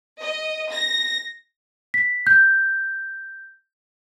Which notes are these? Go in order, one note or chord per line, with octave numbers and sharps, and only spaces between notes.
D#5
A#6
B6
G6